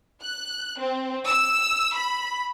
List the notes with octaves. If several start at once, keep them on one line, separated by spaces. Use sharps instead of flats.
F#6
C4
E6
B5